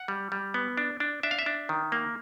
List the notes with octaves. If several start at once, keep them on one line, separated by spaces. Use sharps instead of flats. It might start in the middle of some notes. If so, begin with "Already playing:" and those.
Already playing: F#5
G3
G3
B3
D4
D4
D4 E5
F5
E5
D4
D#3
A#3